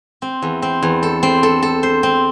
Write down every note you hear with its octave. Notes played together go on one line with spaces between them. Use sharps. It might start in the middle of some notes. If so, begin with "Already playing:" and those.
C4
E2
C4
E2
A4
C4
A4
A4
C5
C4